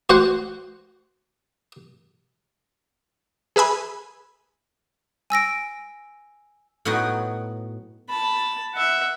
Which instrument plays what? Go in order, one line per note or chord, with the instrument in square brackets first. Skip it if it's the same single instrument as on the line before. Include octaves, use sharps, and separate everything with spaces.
[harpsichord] F#4 C5 F#5
[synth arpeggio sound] G#4 B4 E5 G#5 B5
[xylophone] G#5 E6 A#6 D7
[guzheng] A2 F#3 B3 D#4 F#4 G5
[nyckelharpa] A5 B5
E5 F#5